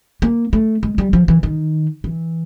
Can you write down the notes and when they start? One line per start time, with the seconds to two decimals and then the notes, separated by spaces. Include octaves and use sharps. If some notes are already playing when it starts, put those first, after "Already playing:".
0.22 A#3
0.53 A3
0.83 G#3
0.98 G3
1.13 F3
1.28 E3
1.43 D#3
2.04 E3